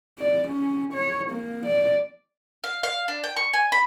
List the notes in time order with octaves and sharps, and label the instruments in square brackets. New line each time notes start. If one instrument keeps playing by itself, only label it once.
[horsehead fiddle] D5
C#4
C#5
A#3
D5
[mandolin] F5
F5
D4
G5
C#6
G#5
B5